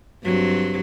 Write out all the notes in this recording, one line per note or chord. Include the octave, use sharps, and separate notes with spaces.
G2 F#3 C4